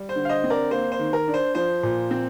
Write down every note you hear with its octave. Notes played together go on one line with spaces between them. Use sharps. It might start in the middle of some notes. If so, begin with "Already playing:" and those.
Already playing: G3
C5
D3
F5
C5 D#5
C4
A#4 D5
A#3 C5
C5
D#3
A#4
D4
C5
F3 C5
A#2
C4